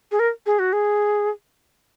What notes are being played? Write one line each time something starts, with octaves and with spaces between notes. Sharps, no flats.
G#4
A#4
G#4
F#4
G#4